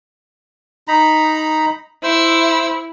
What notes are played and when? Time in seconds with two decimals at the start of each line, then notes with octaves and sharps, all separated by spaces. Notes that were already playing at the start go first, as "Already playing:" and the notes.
0.88 D#4 A#5 B5
2.03 E4 C5 E6